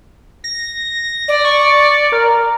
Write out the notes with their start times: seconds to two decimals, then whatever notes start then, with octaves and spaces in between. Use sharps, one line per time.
0.44 A#6
1.28 D5
1.45 C#6
2.12 A#4